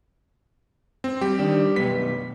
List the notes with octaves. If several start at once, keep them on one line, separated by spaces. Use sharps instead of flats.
C4
G3 G4
D#3 D4
B1 F#2 B3 B6